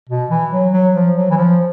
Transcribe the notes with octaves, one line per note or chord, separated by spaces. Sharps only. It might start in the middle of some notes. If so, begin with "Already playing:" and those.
B2
E3
F#3
F#3
F3
F#3
E3
F3